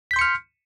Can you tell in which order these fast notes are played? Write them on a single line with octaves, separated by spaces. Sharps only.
B6 G6 C6 C#7 F6